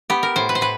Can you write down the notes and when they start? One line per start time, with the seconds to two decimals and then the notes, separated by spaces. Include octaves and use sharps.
0.10 B3 G4
0.23 A#4
0.36 A2 C5
0.49 B4
0.55 C5
0.61 A2 B4